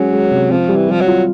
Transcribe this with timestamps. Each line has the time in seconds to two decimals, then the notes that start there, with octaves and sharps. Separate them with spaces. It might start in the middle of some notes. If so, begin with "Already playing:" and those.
Already playing: F#3 G#3 C#4
0.13 G#3
0.31 C3
0.50 F3 C4
0.69 G3
0.76 E3
0.89 F3 G3
1.01 F#3
1.07 F4